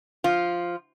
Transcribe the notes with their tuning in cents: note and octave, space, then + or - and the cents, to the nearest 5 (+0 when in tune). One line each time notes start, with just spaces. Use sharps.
F3 +0 F4 +0